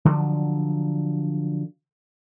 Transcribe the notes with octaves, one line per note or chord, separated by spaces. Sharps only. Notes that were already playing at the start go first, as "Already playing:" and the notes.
D3 F3 F#3